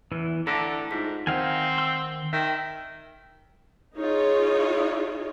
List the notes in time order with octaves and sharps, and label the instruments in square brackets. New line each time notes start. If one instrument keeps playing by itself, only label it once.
[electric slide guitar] E2 [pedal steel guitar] E3
[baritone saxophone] D3 [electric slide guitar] E4 A4 [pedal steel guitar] A#5 [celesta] B6
[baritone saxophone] G#2 [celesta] D#4 F4 B6
[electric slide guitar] D#3 C5 [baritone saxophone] C4 [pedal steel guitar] D#4 F5 G#5 [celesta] F#5
[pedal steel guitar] C6 E6
[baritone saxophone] D#3 [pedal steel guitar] E5 [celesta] G5
[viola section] D#4 F4 G#4 C#5